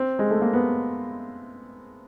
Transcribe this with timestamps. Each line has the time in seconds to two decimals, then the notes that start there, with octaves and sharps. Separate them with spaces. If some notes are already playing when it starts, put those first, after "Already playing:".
Already playing: C4
0.19 G#3
0.31 A3
0.42 A#3
0.53 B3